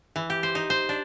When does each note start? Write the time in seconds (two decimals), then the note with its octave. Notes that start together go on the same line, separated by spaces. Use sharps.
0.16 E3
0.30 G4
0.43 C5
0.55 D#4
0.70 C5
0.89 D4